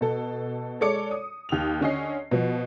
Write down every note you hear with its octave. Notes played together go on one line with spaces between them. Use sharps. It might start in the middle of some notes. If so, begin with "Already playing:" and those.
B2 A4
G#3 A4 C#5 D5 D6 C#7
D#6
D#2 D#6 F7
D3 C#4 D#5 C7
B2 F3